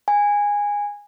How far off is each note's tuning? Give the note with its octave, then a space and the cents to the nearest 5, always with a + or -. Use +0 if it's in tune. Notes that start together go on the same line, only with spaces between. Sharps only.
G#5 -15